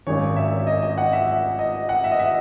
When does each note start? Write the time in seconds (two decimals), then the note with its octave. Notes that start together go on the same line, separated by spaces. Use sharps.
0.07 G#1 F#2 D#3 C#5
0.36 E5
0.67 D#5
0.82 D#5
0.98 F#5
1.13 E5
1.27 E5
1.59 D#5
1.89 F#5
2.04 E5
2.11 D#5
2.19 E5